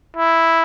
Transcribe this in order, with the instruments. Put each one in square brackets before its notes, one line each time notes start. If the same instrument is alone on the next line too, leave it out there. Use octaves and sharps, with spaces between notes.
[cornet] E4